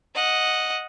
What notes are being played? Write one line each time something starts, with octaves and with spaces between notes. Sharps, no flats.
D#5 F#5